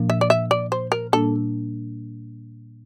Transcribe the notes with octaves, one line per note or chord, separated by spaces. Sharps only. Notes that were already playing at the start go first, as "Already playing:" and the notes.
Already playing: A#2 F3 A#3 D4
E5
D5
E5
D5
C5
A#4
A#2 G3 A#3 D4 A4